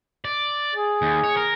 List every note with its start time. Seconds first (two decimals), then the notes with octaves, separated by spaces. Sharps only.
0.25 D5
0.75 G#4
1.02 D#2
1.24 C#5
1.37 A#4